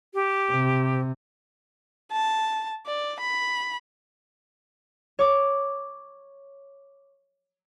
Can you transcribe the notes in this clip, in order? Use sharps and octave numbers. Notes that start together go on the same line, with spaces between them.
G4
C3
A5
D5
B5
C#5 D6